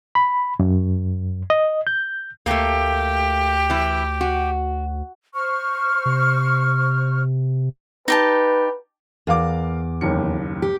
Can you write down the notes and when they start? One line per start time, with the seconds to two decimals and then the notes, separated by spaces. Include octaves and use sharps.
0.15 B5
0.60 F#2
1.50 D#5
1.87 G6
2.46 D2 A3 A#3 G4
3.70 E3 E4
4.21 F#4
5.34 C5 C#6 F6
6.06 C3
8.08 D#4 G4 B4 A5
9.27 E2 A#4 F5 D6
10.01 F#1 D#2 C#7
10.62 G4